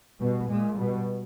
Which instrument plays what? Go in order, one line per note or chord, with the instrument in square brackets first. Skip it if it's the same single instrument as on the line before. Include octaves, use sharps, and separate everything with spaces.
[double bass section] B2 [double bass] G3
[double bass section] A#2 [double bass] G#3
[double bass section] B2 [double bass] G3